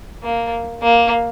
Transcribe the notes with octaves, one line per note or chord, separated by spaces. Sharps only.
A#3
A#3